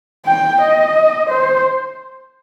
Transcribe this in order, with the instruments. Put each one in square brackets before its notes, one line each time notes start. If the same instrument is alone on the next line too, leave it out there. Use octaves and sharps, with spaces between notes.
[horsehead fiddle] G5
D#5
C5